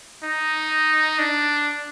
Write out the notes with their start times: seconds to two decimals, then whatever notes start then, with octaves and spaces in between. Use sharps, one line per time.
0.23 D#4
1.19 D4